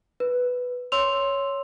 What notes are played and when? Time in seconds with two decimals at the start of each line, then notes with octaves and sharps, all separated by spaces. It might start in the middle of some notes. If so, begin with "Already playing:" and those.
0.20 B4
0.92 C#5 C6 E6 F7